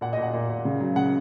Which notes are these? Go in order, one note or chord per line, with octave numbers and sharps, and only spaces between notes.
A#2 F#5
D#5
A#2
F#5
A#2
A#2
C#3
F#3
C#3 F#5